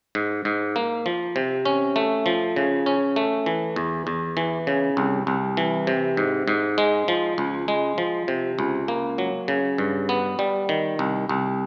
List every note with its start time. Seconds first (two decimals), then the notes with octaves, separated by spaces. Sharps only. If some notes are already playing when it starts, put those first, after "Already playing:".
0.15 G#2
0.45 G#2
0.76 A#3
1.06 F3
1.36 C3
1.65 C#4
1.96 A3
2.26 F3
2.56 C#3
2.86 C#4
3.16 A3
3.46 E3
3.76 E2
4.07 E2
4.37 E3
4.67 C#3
4.97 C2
5.27 C2
5.57 E3
5.87 C3
6.17 G#2
6.48 G#2
6.78 G#3
7.08 F3
7.38 C#2
7.68 G#3
7.98 F3
8.28 C3
8.59 C#2
8.88 A#3
9.18 F#3
9.48 C#3
9.78 G2
10.09 B3
10.39 G3
10.69 D#3
10.99 C2
11.29 C2